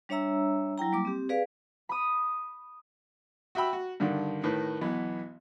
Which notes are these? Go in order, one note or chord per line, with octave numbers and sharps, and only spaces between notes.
G3 D4 C#5 E5 A#5 E6
F#3 E4 G5 A#5
G3 A#3 D6
C4 G4
G#4 B4 D5 F5
B5 D#6
F#4 E5 G5 B5 E6
F#4
G2 D3 D#3
A2 D#3 B4
B1 E3 B3